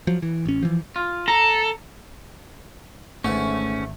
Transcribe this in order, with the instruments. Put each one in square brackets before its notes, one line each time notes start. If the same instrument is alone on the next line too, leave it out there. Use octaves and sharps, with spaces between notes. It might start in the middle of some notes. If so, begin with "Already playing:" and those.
[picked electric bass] F3 F#3
E3
A1 C#4
E3 F3
[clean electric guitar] F4
[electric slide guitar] A4 [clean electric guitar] A#5
[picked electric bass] G#1 [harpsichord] G#2 D3 E3 [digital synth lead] A3 [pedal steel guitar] C#4